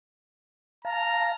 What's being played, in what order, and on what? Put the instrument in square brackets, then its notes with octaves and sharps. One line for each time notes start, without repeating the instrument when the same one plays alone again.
[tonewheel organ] F5 A5 [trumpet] A#5